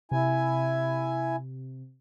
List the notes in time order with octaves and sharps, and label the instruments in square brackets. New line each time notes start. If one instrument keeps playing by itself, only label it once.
[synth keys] C3 [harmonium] E4 G#5